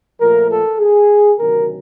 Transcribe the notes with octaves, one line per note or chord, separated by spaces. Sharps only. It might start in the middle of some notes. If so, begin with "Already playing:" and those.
A#2 F3 A3 A#4
A4
G#4
D2 C3 D#3 F#3 A#4